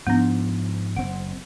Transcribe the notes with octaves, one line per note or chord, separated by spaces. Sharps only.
G#2 F3 B3 D4
F#1 C4 F#5